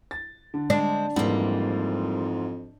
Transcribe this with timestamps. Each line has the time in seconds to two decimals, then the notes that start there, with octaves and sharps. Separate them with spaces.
0.11 A6
0.54 D3
0.70 G#3 C4 D4
1.16 F2 G#2 E3 G3 A#3